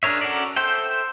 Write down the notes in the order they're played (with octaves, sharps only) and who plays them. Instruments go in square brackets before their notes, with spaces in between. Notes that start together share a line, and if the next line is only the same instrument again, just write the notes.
[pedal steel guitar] D4 G#4 A#4 C#5 E5
C#4 F#4 A4 A#4 D5
A4 C5 E5 G5